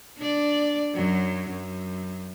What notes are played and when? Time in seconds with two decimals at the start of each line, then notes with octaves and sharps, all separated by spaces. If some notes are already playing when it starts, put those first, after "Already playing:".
0.18 D4 D5
0.94 F#2 F#3
1.50 F#2